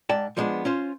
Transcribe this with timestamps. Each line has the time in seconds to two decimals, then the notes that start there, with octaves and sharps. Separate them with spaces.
0.09 G#2 D5 G5 A5
0.37 F3 G3 G#3 B3 D4
0.65 C#4 F4 C5